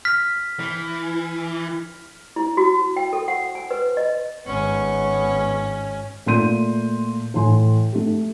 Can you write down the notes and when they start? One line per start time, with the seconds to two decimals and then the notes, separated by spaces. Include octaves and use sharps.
0.05 F6 B6
0.59 E3
2.36 E4
2.57 F#4
2.97 G5
3.13 A4
3.28 F#5
3.55 G#5
3.71 B4
3.97 D#5
4.47 G#1 B3 C#4 C#6
6.26 A#2 A3 F4 C6 G6 D#7
7.34 A2 E3 G#5 C6
7.93 A3 G4